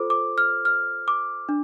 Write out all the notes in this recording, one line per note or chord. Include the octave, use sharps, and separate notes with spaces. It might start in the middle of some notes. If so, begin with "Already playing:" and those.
Already playing: F4 A4 C5 D6
D6
F6
F6
D6
D4